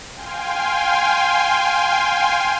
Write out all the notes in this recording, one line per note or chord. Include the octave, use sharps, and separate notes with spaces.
F5 G5 G#5 C6